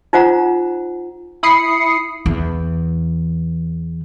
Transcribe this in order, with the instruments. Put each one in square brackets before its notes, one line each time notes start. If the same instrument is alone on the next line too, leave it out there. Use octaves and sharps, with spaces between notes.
[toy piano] D#4 F4 C5 F#5 A#5
[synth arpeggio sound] E4 B5 D#6 C7 C#7
[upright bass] E2 E3